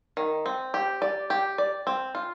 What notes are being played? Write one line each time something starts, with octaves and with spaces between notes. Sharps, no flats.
D#3
C4
G4
D5
G4
D5
C4
F4